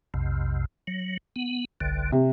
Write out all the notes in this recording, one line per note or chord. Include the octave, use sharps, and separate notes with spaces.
B1 F2 C3
F#3
B3
G1 C2 D3
C3